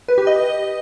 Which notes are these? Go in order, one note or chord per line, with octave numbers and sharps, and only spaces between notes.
B4
G4
D#5